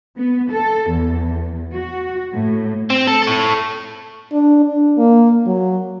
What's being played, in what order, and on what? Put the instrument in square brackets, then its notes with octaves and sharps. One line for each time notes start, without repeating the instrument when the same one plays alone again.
[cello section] B3
A4
E2
F#4
A2
[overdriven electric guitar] C4
A4
A4 C#5
[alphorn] D4
D4
A#3
F#3